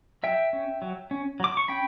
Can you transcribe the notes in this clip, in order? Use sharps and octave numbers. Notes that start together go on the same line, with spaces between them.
F#3 E5 G5
C#4
F#3
C#4
F#3 D6
C#6
C#4 G5 B5